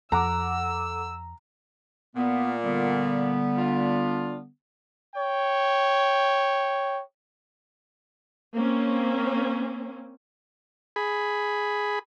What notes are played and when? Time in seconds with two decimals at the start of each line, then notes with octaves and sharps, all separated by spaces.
0.12 F2 A4 F#5 A#5 D6 E6
2.16 A#2 B3
2.64 D3 G3 B3
3.57 D4 F4
5.14 C#5 G5
8.55 A#3 C4 C#4
10.96 G#4 B5